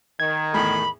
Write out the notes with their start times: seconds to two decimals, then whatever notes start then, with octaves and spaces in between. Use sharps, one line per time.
0.20 D#3 G#6
0.53 E2 A2 G#4 B5